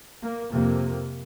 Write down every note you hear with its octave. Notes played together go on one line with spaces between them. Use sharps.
A#3
F2 C3 A#3